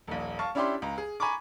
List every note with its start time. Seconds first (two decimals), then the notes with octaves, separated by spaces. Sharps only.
0.08 D#1 A#1
0.39 F5 A5 C#6
0.55 C#4 D4 E4 G4 D5 C6
0.82 C#2 A#5
0.98 G#4
1.20 G#5 A#5 B5 C#6 D6